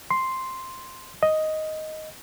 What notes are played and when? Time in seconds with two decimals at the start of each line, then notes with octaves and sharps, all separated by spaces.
0.10 C6
1.23 D#5